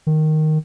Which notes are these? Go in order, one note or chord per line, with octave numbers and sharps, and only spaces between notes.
D#3